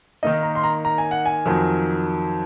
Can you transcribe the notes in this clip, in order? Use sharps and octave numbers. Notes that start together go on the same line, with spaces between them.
D#3 A#3 D#4 D#5
A#5
C6
A#5
A#5
G#5
F#5
G#5
F2 D#3 F#3